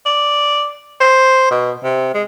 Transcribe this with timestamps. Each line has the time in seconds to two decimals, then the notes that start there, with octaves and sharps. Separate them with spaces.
0.06 D5
1.00 C5
1.51 B2
1.83 C3
2.14 G#3